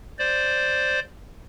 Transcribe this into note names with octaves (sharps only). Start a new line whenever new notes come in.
C5 D5